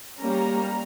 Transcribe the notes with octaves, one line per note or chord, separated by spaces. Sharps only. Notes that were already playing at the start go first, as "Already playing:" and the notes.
G3 A#3 C#4 A#5